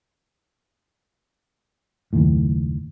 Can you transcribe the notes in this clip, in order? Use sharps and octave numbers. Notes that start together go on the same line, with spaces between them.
F#1 D#2 A2